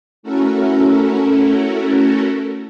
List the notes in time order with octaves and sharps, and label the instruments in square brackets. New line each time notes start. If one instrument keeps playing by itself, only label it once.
[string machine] A3 C#4 E4 F#4 A4 A#4